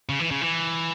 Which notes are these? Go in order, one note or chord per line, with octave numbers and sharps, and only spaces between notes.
C#3
E3
C#3
E3